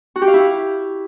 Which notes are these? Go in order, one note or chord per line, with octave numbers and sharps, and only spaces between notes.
F#4
G4
F5
E4